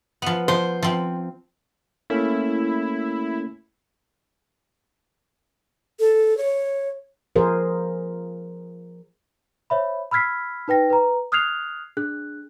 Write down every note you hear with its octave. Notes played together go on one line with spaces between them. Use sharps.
F3 B3
F3 C5
F3 C4
A3 A#3 C#4 E4
A4
C#5
F3 G#4 A#4 C5
C5 C#5 E5 B5
B5 E6 F6 G#6 B6 C7
D#4 B4 G5 A#6
B4 A#5
D#6 F6 F#6 G#6 C7 F7
D4 G#4 F#6